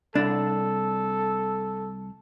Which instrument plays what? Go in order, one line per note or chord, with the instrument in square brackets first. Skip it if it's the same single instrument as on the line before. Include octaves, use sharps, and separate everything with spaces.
[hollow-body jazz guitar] C2 D4 [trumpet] A4